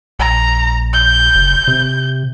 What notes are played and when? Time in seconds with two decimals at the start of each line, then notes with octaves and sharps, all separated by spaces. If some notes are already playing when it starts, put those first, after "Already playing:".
0.19 A#1 A#5
0.93 G6
1.35 F#1
1.68 C3